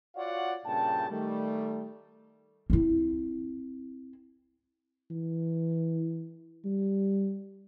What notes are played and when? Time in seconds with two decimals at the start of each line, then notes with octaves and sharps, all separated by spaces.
0.16 F4 F#4 C#5 D5 F5 F#5
0.65 G2 A#2 C#3 G5 A5
1.09 D#3 G3 A3
2.70 C4 E4
5.11 E3
6.65 G3